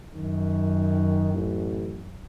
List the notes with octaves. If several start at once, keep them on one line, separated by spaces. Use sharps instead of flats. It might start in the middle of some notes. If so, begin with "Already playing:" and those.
F#2 D#3
A1